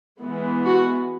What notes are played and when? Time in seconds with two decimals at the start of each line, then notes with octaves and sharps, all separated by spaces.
0.22 E3 G#3 B3
0.66 F#4